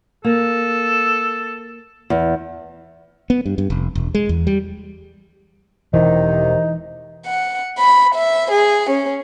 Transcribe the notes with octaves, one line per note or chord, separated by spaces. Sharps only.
A#3 A4
E2
B3
G2
G2
F1
E1
G#3
E2
G3
E1 C3 D#3 E3 D#4
F#5
B5
E5
G#4
C#4